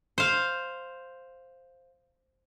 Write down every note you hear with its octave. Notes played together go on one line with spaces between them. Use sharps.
C5 F5